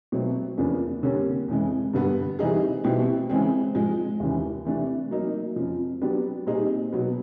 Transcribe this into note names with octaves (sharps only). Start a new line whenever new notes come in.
B2 F#3 A3 C4
E2 C#3 F3 A#3 D4
F2 D3 G3 A#3 C#4
F2 C#3 E3 G#3
G2 D3 G3 B3
E3 G3 C4 D#4 G#4
B2 G3 C4 E4 G4
C#3 E3 G#3 C4
G#2 F3 G#3
D#2 C#3 E3
C3 E3 A3 D4
F#3 A#3 D#4
F2 C#3 F3
F#3 B3 D4 G4
A#2 G3 C4 D#4 G#4
B2 F#3 B3